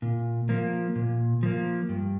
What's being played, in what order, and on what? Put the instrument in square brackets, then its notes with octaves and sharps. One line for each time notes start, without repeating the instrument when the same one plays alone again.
[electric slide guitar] A#2
F3 A#3
A#2
F3 A#3
G2